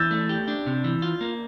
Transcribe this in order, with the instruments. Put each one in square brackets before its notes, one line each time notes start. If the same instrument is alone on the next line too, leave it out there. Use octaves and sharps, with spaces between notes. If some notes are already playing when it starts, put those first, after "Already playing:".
Already playing: [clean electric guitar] E3 [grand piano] E6 G6 A6
[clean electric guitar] A3
G4
D4
C3
E3
F4
A#3